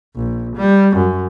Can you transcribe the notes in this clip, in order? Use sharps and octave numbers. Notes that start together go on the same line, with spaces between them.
A#1
G3
F#2